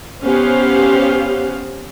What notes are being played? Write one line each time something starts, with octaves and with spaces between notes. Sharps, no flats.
B3 C#4 G4 C5 F5